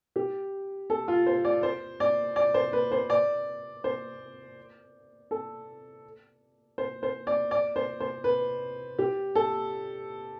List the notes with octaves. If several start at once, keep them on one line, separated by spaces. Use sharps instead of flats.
G4
A4
F4
C5
D5
C5
D5
D5
C5
B4
C5
D5
C5
A4
C5
C5
D5
D5
C5
C5
B4
G4
A4